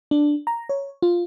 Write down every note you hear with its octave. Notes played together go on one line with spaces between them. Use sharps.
D4
A#5
C#5
F4